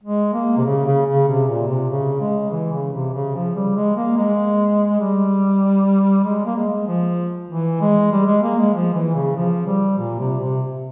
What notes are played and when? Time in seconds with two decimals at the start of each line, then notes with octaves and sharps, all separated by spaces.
0.03 G#3
0.33 A#3
0.57 C3
0.65 C#3
0.86 C#3
1.06 C#3
1.28 C3
1.48 A#2
1.68 C3
1.89 C#3
2.20 G#3
2.51 E3
2.72 C#3
2.93 C3
3.14 C#3
3.35 F3
3.55 G3
3.76 G#3
3.97 A#3
4.17 G#3
5.00 G3
6.24 G#3
6.45 A#3
6.57 G#3
6.87 F3
7.49 E3
7.81 G#3
8.12 G3
8.27 G#3
8.43 A#3
8.58 G#3
8.74 F3
8.94 E3
9.15 C#3
9.36 F3
9.66 G3
9.98 A#2
10.19 C3
10.40 C3